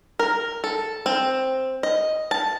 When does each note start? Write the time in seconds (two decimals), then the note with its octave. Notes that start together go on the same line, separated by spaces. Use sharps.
0.19 A#4
0.64 A4
1.06 C4
1.83 D#5
2.31 A5